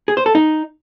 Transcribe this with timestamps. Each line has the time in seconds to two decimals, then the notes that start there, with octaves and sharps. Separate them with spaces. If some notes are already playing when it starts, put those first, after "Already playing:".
0.08 G#4
0.17 C5
0.26 A4
0.35 D#4